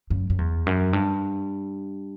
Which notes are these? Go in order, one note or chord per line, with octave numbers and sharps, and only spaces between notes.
F#2
F#2
E2
F#2
G2